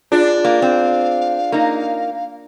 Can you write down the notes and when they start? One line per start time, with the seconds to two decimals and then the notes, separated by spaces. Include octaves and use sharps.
0.12 D4 F4 G#4
0.44 A#3 F5
0.62 C4
1.52 A#3 D#4